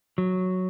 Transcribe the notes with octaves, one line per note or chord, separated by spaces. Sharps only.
F#3